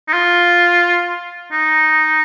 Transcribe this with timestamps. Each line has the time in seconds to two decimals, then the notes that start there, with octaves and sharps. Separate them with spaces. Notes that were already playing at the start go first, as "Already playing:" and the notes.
0.08 D#4
0.13 F4
1.52 D#4